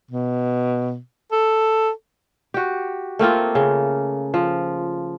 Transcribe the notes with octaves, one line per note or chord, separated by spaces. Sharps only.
B2
A4
F#4 G4
A3 A#3 C4 F4
C#3
F3